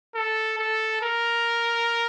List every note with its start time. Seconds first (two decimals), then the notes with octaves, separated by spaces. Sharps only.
0.15 A4
0.59 A4
1.02 A#4